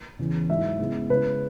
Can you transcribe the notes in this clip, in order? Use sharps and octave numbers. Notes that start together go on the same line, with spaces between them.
E2 C#3 E3
G#2 F#3 E4 E5
C#3 G#3 B3 E4
C#3 G#3 E4 B4